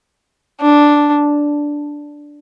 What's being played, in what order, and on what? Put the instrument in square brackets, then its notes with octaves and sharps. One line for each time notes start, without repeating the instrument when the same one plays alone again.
[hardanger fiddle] D4